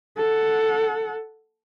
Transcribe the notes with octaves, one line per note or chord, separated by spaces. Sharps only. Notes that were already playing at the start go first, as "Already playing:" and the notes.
A4 F#5